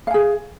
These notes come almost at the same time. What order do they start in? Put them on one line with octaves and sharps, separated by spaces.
F5 G#5 G#4